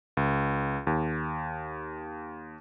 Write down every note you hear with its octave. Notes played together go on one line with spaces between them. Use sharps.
C#2
D#2